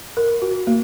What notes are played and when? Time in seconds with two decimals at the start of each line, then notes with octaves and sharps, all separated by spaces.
0.17 A#4
0.42 F#4
0.67 A#3